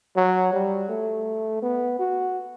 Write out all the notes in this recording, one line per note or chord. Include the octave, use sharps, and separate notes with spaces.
F#3
G3
A3
B3
F#4